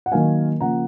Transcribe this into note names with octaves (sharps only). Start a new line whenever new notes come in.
F#5
D#3 F#3 A#3 F5 G#5
C#3 F3 A#3 F#5 A#5